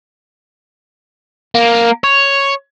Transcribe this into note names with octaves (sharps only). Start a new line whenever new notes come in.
A#3
C#5